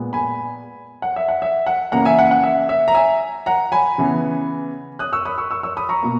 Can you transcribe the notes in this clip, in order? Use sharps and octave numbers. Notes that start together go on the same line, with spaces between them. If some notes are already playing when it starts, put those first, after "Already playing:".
Already playing: A#2 G#3 B3
G#5 B5
F#5
E5
F#5
E5
F#5
C#3 E3 A#3 F#5 A#5
E5 G#5
F#5
F#5
E5
E5
A#5
E5 G#5
F#5 A#5
G#5 B5
C#3 E3 B3
D#6 F#6
C#6 E6
B5 D#6
C#6 E6
C#6 E6
C#6 E6
B5 D#6
A#5 C#6
B2 A#3